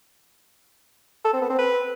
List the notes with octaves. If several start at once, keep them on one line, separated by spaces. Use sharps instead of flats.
A4
C4
B3
C4
B4